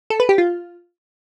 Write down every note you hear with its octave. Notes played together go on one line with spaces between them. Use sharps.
A4
B4
G4
F4